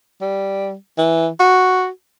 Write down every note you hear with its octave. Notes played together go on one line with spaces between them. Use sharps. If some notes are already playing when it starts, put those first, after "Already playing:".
G3
E3
F#4